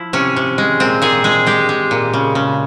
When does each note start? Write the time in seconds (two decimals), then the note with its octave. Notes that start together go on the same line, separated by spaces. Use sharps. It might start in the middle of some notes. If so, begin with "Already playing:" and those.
Already playing: F3 E4
0.13 C3 C#4
0.36 C3
0.58 G#3
0.80 A#2 C4
1.02 A#2 G#4
1.24 G#3 G#4
1.47 G#3 G4
1.69 G#3
1.91 A#2
2.14 C#3
2.35 C#3